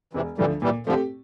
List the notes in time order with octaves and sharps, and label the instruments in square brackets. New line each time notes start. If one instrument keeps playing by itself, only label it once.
[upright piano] E1 [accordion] C3 E3
[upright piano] D2 D3 F3 A3 [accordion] E3 G3
[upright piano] A#2 [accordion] E3 G3
[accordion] D3 F3 [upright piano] A3 C4 G4